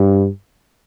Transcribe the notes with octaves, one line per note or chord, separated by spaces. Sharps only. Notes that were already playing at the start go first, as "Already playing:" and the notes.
Already playing: G2